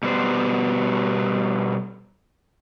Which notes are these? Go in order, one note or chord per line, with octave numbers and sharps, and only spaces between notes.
B2 G3 B3 C5